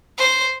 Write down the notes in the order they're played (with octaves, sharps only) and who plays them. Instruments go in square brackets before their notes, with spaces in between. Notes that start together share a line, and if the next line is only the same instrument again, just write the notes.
[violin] C5